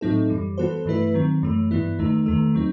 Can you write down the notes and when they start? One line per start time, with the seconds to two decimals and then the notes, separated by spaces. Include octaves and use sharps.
0.01 A2 F#3 C4 D#4 A4
0.30 F#2 E3 G3
0.58 E3 B3 F#4 A4 C5
0.85 G2 E3 A3 E4 B4
1.14 D#3 F#3 C4
1.43 F#2 E3 A3
1.71 G2 E3 B3 E4
1.99 E2 D#3 A3 D#4
2.26 E2 D#3 A3
2.55 F#3 C4 D#4